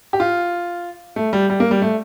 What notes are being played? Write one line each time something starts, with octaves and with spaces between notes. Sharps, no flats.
G4
F4
A3
G3
G3
A#3
G3
A3